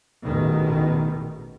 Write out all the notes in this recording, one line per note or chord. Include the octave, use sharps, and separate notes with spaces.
A1 E2 B2 D#3